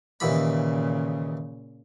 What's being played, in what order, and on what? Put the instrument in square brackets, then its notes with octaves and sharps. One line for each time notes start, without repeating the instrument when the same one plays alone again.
[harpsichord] D#2 E3 B5 [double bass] A#2 C#3